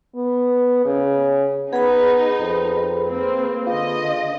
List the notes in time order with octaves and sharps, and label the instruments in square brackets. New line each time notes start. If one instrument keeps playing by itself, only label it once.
[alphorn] B3
C#3
[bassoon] B3 [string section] D#4 [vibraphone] G#4 B4 B5
[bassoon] F2
[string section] A#3 C4
[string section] D3 D#5 [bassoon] F4